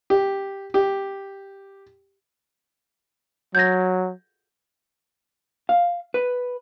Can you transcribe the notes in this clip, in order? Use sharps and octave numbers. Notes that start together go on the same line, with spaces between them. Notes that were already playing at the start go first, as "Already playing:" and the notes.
G4
G4
F#3 G6 G#6 A#6
F5
B4